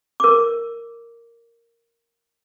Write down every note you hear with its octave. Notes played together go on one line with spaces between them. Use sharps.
A#4 D6